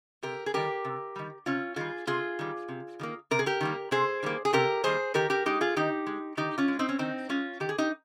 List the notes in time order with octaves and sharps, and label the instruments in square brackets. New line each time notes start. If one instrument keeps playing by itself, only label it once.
[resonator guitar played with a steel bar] C3 G4 A#4
G#4
D#3 G3 G4 A#4
C3
D#3 G3
C3 C#4 F4
D#3 G3 F4 G#4
C3 F4 G#4
D#3 G3
C3
D#3 G3 A#3
C3 A#4
G#4
G4 A#4
D#3 G3 A#3
C3 G#4 C5
D#3 G3 A#3
G#4
C3 G4 A#4
D#3 G3 A#3 G#4 C5
D#3 G4 A#4
G4 A#4
G#3 D#4 G4
F4 G#4
D#3 D#4 G4
G#3
D#3 D#4 G4
C#4 F4
G#3
C4 D#4
C#4
D#3 C4 D#4
G#3 C#4 F4
D#3 G4
G#4
D#4 G4